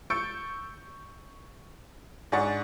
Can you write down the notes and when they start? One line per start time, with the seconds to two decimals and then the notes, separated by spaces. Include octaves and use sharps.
0.10 C#6 E6 G6 A6 C#7 D7
2.32 G#2 D4 G#4 F#5 C#6 A6